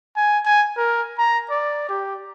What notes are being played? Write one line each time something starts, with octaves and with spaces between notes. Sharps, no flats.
G#5
G#5
A#4
A#5
D5
G4